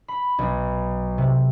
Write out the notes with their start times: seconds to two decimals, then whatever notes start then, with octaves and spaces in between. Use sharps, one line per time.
0.08 B5
0.38 B1
1.18 C3